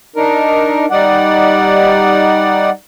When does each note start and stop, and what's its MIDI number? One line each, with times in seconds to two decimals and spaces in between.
0.16 0.86 62
0.16 0.86 63
0.16 0.86 70
0.91 2.70 55
0.91 2.70 63
0.91 2.70 74
0.91 2.70 78